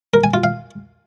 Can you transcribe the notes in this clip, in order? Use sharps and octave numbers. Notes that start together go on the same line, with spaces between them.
A#4
G#5
F4
F5